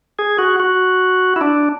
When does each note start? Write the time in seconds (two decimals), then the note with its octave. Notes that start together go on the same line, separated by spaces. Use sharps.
0.19 G#4
0.39 F#4
0.60 F#4
1.36 E4
1.41 D4